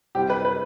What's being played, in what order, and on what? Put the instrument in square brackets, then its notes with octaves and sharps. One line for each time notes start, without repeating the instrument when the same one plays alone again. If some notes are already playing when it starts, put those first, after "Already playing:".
[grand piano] C3 G3 C4 E4 [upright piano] G4
[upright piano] B4
B4